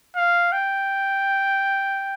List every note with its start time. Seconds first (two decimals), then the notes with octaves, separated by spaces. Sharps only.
0.16 F5
0.52 G5